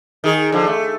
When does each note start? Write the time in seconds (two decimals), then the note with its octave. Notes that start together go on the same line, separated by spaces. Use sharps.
0.24 D#3 G#4
0.52 D3 F3
0.67 A3